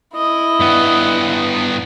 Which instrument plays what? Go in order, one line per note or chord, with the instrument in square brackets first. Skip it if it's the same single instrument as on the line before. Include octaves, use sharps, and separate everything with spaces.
[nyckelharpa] E4 D#5
[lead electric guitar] G2 B3